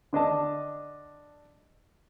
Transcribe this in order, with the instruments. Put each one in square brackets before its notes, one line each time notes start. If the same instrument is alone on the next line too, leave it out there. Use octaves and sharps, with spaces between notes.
[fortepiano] D3 D4 D#5 A5